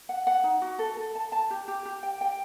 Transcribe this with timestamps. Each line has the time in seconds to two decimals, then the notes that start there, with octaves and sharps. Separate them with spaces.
0.09 F#5
0.27 F#5
0.44 D#4
0.62 F#4
0.79 A4
0.97 A4
1.15 A5
1.32 A5
1.51 G4
1.68 G4
1.86 G4
2.03 G5
2.21 G5